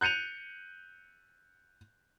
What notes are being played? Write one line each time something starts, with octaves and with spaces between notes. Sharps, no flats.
F#6 G6 C#7 D#7 F7